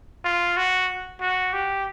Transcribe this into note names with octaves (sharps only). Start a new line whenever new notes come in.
F4
F#4
F#4
G4